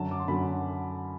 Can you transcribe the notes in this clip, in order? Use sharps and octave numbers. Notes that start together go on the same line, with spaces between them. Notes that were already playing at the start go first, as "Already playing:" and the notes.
Already playing: F#2 D3 F#3 A5
D6
C6
F#2 D3 F#3 B5